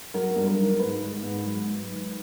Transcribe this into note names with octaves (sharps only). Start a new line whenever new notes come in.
F#3 A#4
G2
A#4
D#3
G#2 B4
D#3
G#2
F#3
G#2
D#3